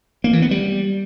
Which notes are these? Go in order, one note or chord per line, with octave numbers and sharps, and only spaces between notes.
A#3
E3
B3
G3